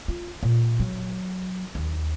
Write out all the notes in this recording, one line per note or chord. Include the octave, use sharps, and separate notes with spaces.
F4
A#2
F#3
D#2